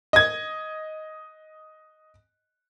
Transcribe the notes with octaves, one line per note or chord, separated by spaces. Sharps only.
D#5 G#6